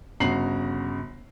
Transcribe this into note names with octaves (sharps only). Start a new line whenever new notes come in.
G1 C#3 F#4 A#5 C7 F#7